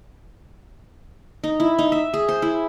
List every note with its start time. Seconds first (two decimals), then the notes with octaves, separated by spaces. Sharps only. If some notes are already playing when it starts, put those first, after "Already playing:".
1.44 D#4
1.60 E4
1.79 D#4
1.92 E5
2.14 G#4
2.29 C5
2.42 E4